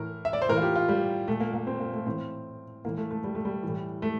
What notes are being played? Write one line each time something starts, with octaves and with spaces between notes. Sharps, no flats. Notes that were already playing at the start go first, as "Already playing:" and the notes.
Already playing: A2 E3 A#4
E5
D5
C5
A2 E3 A#4
F4
G4
F4
G3
A#2 A3
A#3
A#3
C4
A#3
A3
A2 E3 C4
A2 E3 A#3
A3
A3
G3
A3
G3
A2 E3
A3